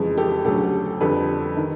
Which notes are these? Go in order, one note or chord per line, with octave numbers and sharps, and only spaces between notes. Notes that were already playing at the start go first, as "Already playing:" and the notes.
Already playing: F2 C#3 E3 G#3
G4 A4
D2 C#3 F#3 G4 A4
F2 D3 G3 A4 B4
D#3